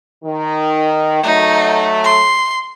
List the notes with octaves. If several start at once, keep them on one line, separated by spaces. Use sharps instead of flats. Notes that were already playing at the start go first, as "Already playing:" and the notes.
D#3
F#3 A3 D#4
C6